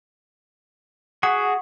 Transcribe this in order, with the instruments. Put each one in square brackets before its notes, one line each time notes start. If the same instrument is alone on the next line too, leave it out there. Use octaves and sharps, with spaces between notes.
[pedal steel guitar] F#4 G#4 [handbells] F#5